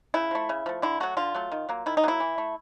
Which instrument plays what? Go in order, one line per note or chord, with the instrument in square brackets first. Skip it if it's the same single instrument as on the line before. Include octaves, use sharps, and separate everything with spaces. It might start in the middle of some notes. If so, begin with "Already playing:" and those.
[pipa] C#3 E4
F3 A3
C#3
F3 A3
D3 E4
F#3 A3 F#4
D3 F4
F#3 A3
D#3
F#3 A#3
D#3 E4
D#4
F#3 A#3 E4
E3
A3